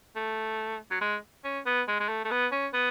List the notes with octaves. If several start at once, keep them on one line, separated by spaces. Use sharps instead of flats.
A3
F#3
G#3
C#4
B3
G#3
G#3
A3
A3
B3
C#4
B3